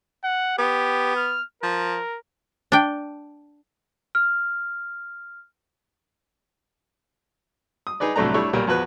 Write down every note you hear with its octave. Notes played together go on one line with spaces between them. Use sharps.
F#5
B3 G4
F6
F3 A#4
D4 G5
F6
D#6
D#4 G#4 B4 D5
C2 A2 F#3 A3 D4 A#5
G3 A3 D4 E4 C#5
B1 A#2 G3 A#4 C#5
E2 F3 F#4 B4 F#6